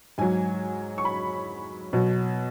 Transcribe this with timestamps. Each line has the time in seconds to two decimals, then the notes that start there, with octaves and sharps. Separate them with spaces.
0.18 G#2 F#3 G#5
0.98 C#6
1.05 B5
1.93 B2 F#3